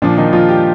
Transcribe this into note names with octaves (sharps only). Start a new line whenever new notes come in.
A#2 F3 D4
D#3 D#4
F3 F4
G3 G4